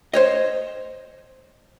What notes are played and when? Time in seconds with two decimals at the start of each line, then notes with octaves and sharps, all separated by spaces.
0.13 C5 C#5 D#5